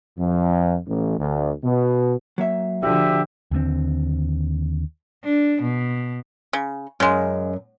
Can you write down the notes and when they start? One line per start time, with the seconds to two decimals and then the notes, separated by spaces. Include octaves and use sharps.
0.19 F2
0.87 A1
1.19 D2
1.64 B2
2.38 F#3 A#3 E5
2.83 D3 F3 F#4 G4 E5
3.51 D#2 D3 B3 C4
5.25 D4
5.62 B2
6.53 C#3
7.00 F#2 C#3 G#3